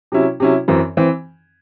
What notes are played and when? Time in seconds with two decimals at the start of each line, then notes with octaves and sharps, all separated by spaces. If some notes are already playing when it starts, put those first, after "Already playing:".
0.12 C3 F#3 C#4 E4
0.40 C3 F#3 C#4 E4
0.68 F#2 E3 C4
0.97 E3 C4